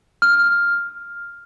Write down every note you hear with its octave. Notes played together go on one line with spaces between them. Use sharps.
F6